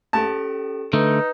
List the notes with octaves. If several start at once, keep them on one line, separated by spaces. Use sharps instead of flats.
C#4 G4 A4 A5
D3 A3 D#4 B4